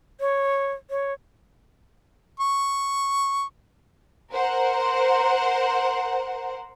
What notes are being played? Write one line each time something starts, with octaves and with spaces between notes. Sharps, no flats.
C#5
C#5
C#6
A#4 C5 F#5